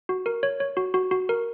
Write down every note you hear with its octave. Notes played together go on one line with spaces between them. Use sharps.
F#4
A#4
C#5
C#5
F#4
F#4
F#4
A#4